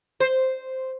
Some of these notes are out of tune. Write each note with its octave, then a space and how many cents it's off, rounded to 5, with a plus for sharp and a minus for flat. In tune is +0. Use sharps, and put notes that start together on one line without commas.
C5 -5